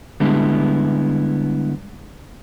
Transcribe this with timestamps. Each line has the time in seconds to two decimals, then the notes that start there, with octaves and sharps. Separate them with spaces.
0.20 D3 G3 G#3 B3 D4 E4